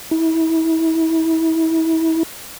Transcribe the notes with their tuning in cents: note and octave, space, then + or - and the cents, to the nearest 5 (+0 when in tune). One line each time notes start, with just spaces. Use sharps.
E4 -30